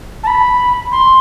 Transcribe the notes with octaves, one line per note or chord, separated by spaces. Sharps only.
A5
B5
C6